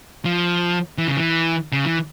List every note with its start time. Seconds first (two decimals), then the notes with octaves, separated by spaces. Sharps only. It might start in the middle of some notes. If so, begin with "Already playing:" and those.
0.25 F3
0.98 E3
1.08 C#3
1.17 E3
1.72 C#3
1.85 E3